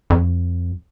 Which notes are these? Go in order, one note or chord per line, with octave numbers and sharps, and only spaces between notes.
F2